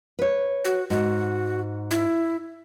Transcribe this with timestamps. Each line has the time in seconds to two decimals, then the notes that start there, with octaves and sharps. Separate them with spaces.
0.19 B4 C#5
0.65 F#4
0.90 G#2 F#4
1.91 E4